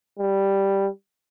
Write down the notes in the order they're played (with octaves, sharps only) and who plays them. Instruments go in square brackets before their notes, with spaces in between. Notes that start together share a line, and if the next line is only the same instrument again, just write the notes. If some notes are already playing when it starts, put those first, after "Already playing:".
[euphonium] G3